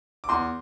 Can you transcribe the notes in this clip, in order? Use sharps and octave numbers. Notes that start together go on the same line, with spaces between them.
D6
E2 C6